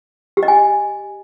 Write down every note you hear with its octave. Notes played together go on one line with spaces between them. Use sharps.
G4
D#5
G#5